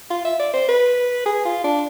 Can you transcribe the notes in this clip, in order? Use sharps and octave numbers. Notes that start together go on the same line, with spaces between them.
F4
E5
D5
C5
B4
G#4
F4
D4